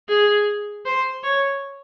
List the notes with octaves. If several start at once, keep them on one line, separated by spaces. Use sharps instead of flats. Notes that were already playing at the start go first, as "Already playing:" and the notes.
G#4
C5
C#5